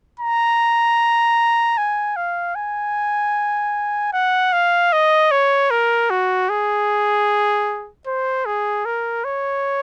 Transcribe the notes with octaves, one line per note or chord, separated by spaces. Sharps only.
A#5
G#5
F5
G#5
F#5
F5
D#5
C#5
A#4
F#4
G#4
C5
G#4
A#4
C#5